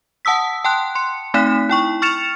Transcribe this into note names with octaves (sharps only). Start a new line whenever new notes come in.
F#5 A5 D#6 E6 B6
G5 A5 C6 F#6
C6 C#7
A3 C4 D#4 F#6 B6 E7
E4 G5 C#6
C#6 F6 A6 C#7 E7 F7